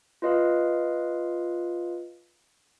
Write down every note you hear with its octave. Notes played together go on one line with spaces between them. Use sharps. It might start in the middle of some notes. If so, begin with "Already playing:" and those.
F4 B4 D#5 F5